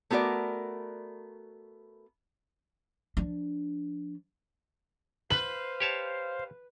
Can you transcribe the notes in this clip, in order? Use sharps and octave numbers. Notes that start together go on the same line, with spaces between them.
A3 B3 F#4 A#4 D5
F3 D4
B4 C5 F5 F#7
G4 C#5 A5